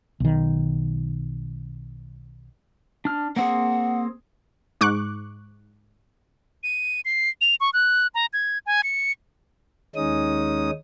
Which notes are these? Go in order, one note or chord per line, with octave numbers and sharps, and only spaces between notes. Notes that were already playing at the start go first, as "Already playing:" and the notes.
B1 D#3
D4 F6
A#3 C4 G#4 F#5
G#2 C#6 D6 F#6
D#7
C7
F7
C#6
F#6
A#5
G#6
G#5
C#7
D#2 G#3 C#4 D#4 D#6